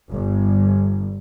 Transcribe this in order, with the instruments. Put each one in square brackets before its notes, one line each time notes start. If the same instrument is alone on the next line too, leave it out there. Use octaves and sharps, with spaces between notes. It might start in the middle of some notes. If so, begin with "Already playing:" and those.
[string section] G1